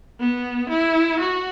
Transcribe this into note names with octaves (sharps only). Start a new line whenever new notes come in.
B3
E4
F#4